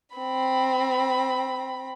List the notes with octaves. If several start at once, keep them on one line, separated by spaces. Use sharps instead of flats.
C4 B5